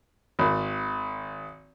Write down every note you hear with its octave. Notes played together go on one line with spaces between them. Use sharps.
G#1